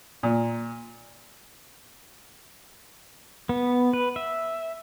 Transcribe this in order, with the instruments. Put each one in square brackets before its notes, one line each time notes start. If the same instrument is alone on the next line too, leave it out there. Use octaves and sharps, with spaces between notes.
[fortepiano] A#2
[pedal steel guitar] B3
B4
E5